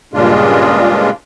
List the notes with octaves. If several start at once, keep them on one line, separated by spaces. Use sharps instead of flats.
G2 A#2 C#3 G#3 D4 F4